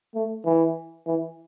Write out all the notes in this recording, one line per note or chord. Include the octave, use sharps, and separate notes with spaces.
A3
E3
E3